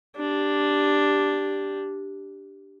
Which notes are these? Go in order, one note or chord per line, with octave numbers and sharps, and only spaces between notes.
D4 G4